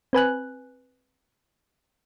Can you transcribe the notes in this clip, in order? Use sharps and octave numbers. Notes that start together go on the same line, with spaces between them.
C4 B4 G#5 F#6